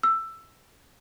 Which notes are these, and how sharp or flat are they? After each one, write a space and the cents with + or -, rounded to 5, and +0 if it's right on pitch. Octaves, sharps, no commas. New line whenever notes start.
E6 +10